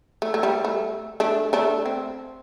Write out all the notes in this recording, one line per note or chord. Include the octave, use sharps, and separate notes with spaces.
A3
A3
G3
A3
A3 D4
A3 D4
C4